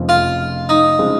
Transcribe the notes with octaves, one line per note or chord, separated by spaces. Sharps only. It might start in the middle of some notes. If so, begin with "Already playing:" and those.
Already playing: F1 F2 C#3 F3 C4
F4
D#4
C#3 F3 G#3 C4